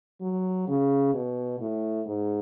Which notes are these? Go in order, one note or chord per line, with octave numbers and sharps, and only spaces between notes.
F#3
C#3
B2
A2
G#2